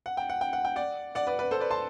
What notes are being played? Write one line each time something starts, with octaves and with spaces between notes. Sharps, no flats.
F#5
G5
F#5
G5
F#5
G5
D5 F#5
D5 F#5
B4 D5
B4 D5
A4 C5
B4 D5
A5 C6